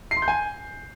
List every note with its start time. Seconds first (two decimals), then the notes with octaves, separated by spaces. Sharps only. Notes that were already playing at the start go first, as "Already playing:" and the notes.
0.11 C7
0.17 C6
0.22 G6
0.28 G#5